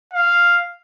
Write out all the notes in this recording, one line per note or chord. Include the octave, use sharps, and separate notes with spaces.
F5